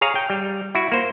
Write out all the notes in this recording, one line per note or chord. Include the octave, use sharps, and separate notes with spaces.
G#4 C#5 F5 A#5
G5
G3
E4 F#4
A#3 C5